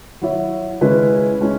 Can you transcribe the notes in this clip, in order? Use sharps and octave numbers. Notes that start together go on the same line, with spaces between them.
F#3 E4 C#5 E5
C#3 G#3 C#4 E4 B4
G#3 C#4 E4